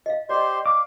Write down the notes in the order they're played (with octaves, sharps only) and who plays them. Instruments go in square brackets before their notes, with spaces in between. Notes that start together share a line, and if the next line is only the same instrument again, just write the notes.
[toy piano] D#5 F5
[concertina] G4 C5 C6 [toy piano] D5 D#5
[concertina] F5 [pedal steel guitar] D6